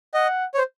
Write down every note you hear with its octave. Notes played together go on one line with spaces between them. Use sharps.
D#5 F#5
C#5
C5